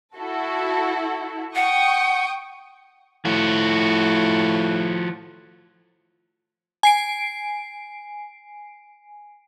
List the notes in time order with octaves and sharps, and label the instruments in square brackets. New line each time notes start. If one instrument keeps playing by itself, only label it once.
[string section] E4 F#4 A4
[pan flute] F#5 [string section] G5 C#6 D#6
[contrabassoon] A2 [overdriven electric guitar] F3 F#4
[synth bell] G#5 C7 D7